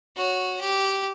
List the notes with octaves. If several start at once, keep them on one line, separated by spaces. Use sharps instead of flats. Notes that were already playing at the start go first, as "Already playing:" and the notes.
F#4 C#5
G4